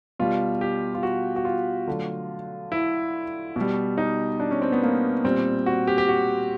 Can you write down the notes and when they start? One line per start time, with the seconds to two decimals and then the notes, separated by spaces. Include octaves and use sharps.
0.19 B2 G3 F4
0.61 G4
0.94 F4
1.03 F#4
1.36 F#4
1.45 F4
1.87 D3 F#3 A3
2.72 E4
3.56 B2 G3
3.98 D#4
4.40 D4
4.51 C#4
4.62 C4
4.72 B3
4.83 A#3
5.24 A#2 G3 C4
5.66 F#4
5.87 G4
5.98 G4
6.09 F#4